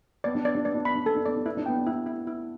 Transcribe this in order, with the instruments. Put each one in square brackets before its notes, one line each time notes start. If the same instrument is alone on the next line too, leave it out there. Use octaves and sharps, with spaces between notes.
[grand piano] B3 [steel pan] D5
[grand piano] D4
[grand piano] B3 [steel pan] D5
[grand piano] D4
[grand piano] B3 [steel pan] D5
[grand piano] D4
[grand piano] B3 [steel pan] B5
[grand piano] D4
[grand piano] B3 [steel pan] A4
[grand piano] D4
[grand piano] B3 [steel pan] D5
[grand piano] D4
[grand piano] B3 [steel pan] E4
[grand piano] D4
[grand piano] B3 [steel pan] G5
[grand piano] D4
[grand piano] B3 [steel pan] E4
[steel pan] E4
E4